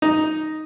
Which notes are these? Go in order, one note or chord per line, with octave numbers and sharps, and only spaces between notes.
D#4